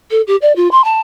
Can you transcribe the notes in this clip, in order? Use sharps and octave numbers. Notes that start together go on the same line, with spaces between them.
A4
G4
D5
F4
C6
A5